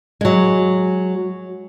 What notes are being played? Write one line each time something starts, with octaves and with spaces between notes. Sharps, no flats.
F#3 G#3